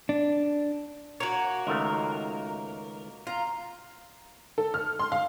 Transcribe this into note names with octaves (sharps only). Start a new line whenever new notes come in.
D4
A#3 F#4 C#5
C#2 D#3 A3 A#4
F4 A#5
A4
F6
C6
F5